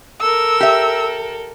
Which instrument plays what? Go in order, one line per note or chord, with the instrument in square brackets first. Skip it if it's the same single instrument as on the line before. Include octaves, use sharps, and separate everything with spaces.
[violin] A4 A#4 [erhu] E6
[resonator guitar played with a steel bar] G4 E5